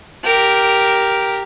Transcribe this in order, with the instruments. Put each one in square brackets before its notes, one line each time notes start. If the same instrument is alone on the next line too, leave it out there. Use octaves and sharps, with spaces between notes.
[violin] G4 A#4